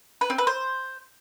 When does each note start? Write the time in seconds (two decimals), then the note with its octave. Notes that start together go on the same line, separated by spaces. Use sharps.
0.21 B4
0.30 C4
0.38 B4
0.47 C5